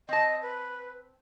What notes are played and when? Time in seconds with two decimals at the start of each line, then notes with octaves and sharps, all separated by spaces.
0.09 C4 D#5 A5
0.42 B4